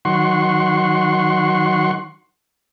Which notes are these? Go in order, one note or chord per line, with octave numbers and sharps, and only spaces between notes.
D#3 F#3 F#5 C6 C#6